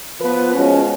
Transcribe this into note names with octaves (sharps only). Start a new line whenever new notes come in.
F3 B3 F4 B4
F3 G#3 C#4 F#4